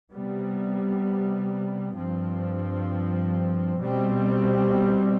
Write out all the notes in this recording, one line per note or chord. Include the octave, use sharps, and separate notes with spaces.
C3 G3 B3
G2 F3 C4
B2 G3 C4